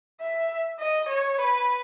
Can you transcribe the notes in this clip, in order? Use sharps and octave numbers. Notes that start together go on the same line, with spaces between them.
E5
D#5
C#5
B4